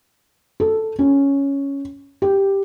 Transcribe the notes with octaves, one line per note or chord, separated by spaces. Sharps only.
A4
C#4
G4